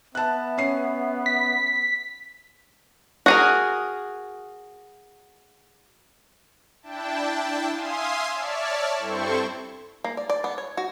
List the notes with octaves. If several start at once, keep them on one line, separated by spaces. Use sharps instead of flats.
B3 E5 A5 F#6
C#4 C7
B6
F#4 G#4 A#4
D4 E4 G5 A5
E5 F5 G#5 C6 D#6
C#5 D5 E5 A5 F6
G2 C4 E4 A4 C5 C#6
A#3
D5
D5
B3
C#5
F#4